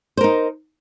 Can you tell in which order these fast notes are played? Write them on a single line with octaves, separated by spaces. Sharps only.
C5 A#4 D#4